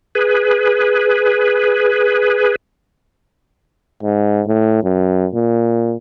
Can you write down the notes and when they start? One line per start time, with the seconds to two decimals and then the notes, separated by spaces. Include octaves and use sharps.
0.15 G#4 B4
4.03 G#2
4.47 A2
4.83 F#2
5.35 A#2